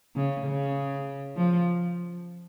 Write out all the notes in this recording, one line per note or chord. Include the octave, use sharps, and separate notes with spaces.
C#3
C#3
F3